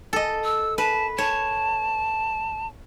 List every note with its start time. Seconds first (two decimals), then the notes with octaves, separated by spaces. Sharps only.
0.13 A4 D#5
0.45 E6
0.78 B4 A5
1.18 C#5 A5